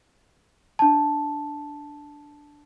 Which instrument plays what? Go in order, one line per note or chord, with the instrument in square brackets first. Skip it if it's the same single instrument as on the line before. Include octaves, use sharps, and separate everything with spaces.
[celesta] D4 A5